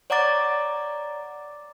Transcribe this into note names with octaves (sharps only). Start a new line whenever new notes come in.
C#5 D5 F#5 A#5 D6 A6